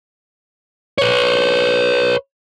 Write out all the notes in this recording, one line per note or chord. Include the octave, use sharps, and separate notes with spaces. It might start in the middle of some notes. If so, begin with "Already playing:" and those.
B4 C#5